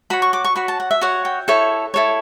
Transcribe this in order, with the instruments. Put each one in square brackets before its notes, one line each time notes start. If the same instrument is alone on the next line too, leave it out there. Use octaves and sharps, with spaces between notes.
[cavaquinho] F#4 C#5 B5
C#6
D6
C#6
F#4 C#5 B5
A5
F#5
E5
F#4 C#5 F#5
G5
E4 A4 C#5
E4 A4 C#5